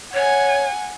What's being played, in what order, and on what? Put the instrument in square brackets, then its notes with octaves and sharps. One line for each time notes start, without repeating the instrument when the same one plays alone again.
[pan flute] C#5 [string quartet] F#5 G#5